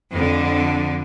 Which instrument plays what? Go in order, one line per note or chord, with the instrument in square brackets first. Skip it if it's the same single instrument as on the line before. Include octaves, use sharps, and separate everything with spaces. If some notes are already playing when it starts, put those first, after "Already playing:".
[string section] F2 D3